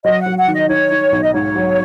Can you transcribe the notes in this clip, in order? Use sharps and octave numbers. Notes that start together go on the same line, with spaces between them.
F#3 D#5
F#5
F#3
F#5
D#3
D#5
D#4 C#5
D#4
B1
D#5
G#2 C#5
F#3